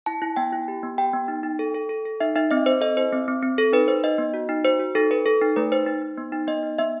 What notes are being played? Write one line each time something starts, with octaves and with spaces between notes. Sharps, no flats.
E4 A5
E4
B3 G5
E4
G4
B3
G4 G5
B3
D#4
D#4
A4
A4
A4
A4
D#4 E5
D#4 E5
C4 D#5
C4 C5
A4 D#5
E4 C5
C4
C4
C4
A4
D#4 B4
D#4 C5
D#4 D#5
B3
F#4
D#4
F#4 C5
F#4
D#4 A4
A4 B4
A4
D#4
A3 B4
D#4 C5
D#4
D#4
B3
D#4
B3 D#5
D#4
B3 E5